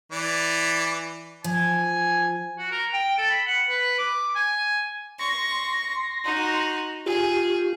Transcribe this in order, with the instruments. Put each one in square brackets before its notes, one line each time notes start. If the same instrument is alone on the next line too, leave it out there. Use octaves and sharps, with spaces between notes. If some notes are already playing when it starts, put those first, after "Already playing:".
[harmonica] E3 D5
[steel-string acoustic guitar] F3 [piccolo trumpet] G#5
[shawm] F#4
A#4
G5
A4
B5
F#5
B4
D6
G#5
[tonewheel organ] C6 A#6 [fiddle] C#6
[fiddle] D#4 F#4
[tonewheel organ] F4 G4 [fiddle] G#4